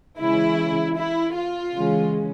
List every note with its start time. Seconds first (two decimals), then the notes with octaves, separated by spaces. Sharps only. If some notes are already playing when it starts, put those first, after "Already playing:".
0.20 C#3 E3 G#3 C#4 E4
0.96 E4
1.35 F4
1.74 C#3 E3 G#3 C#4